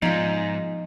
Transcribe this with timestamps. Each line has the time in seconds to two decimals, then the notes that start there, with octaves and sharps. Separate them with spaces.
0.02 G#2 F3 B3 D#4 F4